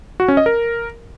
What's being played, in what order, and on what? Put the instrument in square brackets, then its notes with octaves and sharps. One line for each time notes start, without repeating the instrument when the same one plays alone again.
[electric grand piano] F#4
C#4
D#5
A#4